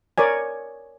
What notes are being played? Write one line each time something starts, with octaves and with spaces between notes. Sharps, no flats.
A#4 C#5 D5 G#5